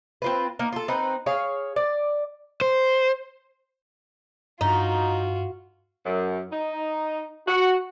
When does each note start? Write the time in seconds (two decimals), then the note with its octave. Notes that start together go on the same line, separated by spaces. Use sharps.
0.22 C4 F4 B4
0.59 A#3 D#4
0.72 F4 A4
0.88 C4 D#4 B4
1.26 G#4 C#5 F5
1.76 D5
2.61 C5
4.61 G2 D#4 F4 F#4
6.05 F#2
6.51 D#4
7.47 F#4